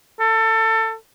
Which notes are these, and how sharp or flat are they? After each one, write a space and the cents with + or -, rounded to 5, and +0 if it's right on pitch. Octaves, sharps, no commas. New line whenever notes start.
A4 +25